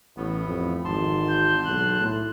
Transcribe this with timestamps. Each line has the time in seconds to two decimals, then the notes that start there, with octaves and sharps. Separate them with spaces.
0.17 A1 A2 B3
0.47 F2
0.85 G#1 E2 A5 C6
1.29 G6
1.66 B1 F#6
2.00 A2